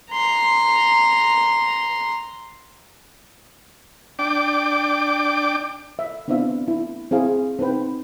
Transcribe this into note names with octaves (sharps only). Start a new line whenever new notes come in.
A#5 C6
D4 G5 D6
E5
B3 C4 D4 E4 E5 F5
E4
C4 E4 G#4 F5
C4 D#4 B4 G5